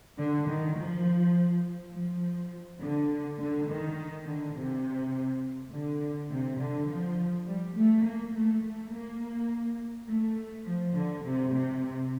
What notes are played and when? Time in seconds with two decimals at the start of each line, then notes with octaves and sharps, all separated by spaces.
0.18 D3
0.48 D#3
0.77 F3
1.93 F3
2.81 D3
3.39 D3
3.68 D#3
4.26 D3
4.55 C3
5.71 D3
6.30 C3
6.59 D3
6.88 F3
7.46 G3
7.76 A3
8.04 A#3
8.33 A3
8.63 A3
8.91 A#3
10.08 A3
10.66 F3
10.95 D3
11.24 C3
11.53 C3